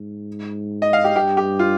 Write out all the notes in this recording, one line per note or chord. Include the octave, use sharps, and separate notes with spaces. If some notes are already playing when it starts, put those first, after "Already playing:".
Already playing: G#2
D#5
F5
G4
G2 G4
G4
F4